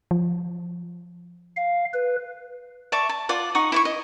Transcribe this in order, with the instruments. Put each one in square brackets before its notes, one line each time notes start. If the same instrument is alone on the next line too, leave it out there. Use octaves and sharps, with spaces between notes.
[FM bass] F3
[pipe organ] F5
B4
[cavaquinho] D5 E5 A5 C#6
A5
F4 D5 F#5
D#4 F#5 C#6 D#6
E4 D5 C#6
D#5